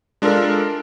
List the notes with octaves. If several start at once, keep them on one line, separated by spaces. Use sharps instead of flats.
G#3 D4 F4 A4 A#4